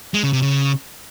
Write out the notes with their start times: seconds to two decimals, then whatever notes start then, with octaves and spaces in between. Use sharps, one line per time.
0.14 G#3
0.23 C#3
0.33 C3
0.42 C#3